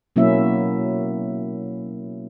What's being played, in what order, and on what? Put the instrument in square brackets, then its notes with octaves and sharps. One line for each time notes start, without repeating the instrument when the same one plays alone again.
[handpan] B2 F#3 A#3 C#4 E4 E5